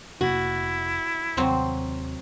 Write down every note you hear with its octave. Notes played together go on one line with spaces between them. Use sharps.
F1 C3 A#3 E4 F#4
D#2 C3 F#3 C4 C5